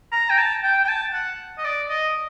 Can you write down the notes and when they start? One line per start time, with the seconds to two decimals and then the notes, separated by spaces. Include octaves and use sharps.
0.12 A#5
0.29 G5
0.38 A5
0.63 G5
0.84 G5
0.88 A5
1.13 F#5
1.58 D#5
1.64 D5
1.89 D#5